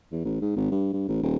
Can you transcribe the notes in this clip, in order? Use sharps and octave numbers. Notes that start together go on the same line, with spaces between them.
E2
A1
G#2
G#1
G2
G2
A1
D#1